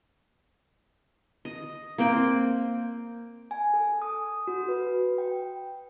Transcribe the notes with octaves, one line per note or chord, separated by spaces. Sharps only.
D#5
A#3 C4 G5
G#5
A4
D#6
F#4
B4
G5